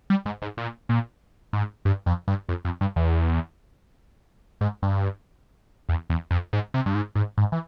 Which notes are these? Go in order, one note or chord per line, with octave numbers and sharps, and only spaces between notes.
G3
G#2
G#2
A#2
A#2
G#2
G2
F2
G2
F2
F2
G2
E2
G#2
G2
E2
E2
F2
G#2
C3
G2
G#2
G#2
G#2
E3